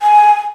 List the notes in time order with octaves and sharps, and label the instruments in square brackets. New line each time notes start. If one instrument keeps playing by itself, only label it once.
[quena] G#5